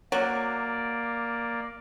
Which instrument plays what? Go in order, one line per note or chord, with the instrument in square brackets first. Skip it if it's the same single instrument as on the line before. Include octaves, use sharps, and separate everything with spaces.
[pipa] F#3 [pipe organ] A#3 D5